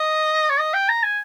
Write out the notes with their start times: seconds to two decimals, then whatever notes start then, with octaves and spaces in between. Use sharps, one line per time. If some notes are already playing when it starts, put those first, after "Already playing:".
Already playing: D#5
0.50 C#5
0.59 D#5
0.74 G5
0.89 A#5
1.03 G#5